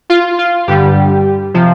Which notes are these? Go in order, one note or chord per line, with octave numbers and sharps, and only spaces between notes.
F4
F4
G2 D3 G3 G4
C3 F3